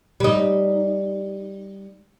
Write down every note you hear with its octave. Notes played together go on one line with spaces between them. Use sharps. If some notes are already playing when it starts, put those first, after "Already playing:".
G3 D#4